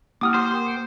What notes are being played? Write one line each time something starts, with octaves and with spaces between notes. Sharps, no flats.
A#3 E4 G4 F#5 G5 D6 D#6 F6
G4 C5 C6
A#4 G5
C#7 D7